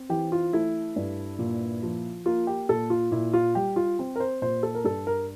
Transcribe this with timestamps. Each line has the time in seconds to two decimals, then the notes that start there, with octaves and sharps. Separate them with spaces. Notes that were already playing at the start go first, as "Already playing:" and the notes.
Already playing: C4
0.09 E3 G4
0.32 F4
0.53 A3 E4
0.96 G2
1.39 A#2
1.83 F3
2.25 A#3 F4
2.47 G4
2.69 A#2 A4
2.90 F4
3.11 A#2 E4
3.33 F4
3.55 G3 G4
3.76 F4
3.99 C4
4.16 A#4
4.20 C5
4.42 A#2 C5
4.63 A4
4.75 A#4
4.84 G2 A4
5.07 A#4